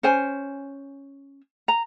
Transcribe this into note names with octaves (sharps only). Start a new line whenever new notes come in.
C#4 C5 G#5
A#5